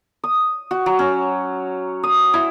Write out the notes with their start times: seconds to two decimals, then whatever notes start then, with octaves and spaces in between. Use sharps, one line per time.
0.24 D#6
0.71 F#4
0.86 F#3
0.99 C#4
2.03 D#6
2.34 E4